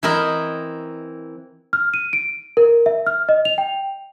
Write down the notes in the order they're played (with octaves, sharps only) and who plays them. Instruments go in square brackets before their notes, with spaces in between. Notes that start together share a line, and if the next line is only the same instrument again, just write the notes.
[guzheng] E3 C4 E4 A#4 D#5
[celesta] F6
D#7
D7
A#4
E5
F6
D#5
F7
G5